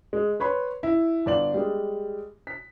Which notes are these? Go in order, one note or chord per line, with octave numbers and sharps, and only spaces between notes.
G#3
B4 C#5 B5 C6
E4
G1 D5 F#7
G3 G#3
B6